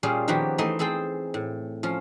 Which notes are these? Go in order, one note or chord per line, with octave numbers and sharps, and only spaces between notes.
A#2 G3 C#4 F4 G#4
D#3 F3 A#3 B3 F#4 G4
E3 A3 D#4 G#5 C6
C4 G#4 A4 C5 G5
A2
F3 C#4 F4